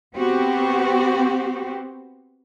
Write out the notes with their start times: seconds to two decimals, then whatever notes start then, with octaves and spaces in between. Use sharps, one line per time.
0.15 B3 C4 F#4 G4